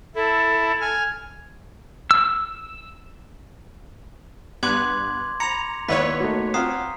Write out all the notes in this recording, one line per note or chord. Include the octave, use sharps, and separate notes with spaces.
E4 A4
G#5 F6
E6
G2 B3 C6 D6 F#6 G#6
A#5 B5 C#7 F7
D#2 B3 E4 B4 C#5 D5 B6
A3 A#3 D#4 F#4
C4 F4 F#5 A#5 D#6 F6 C7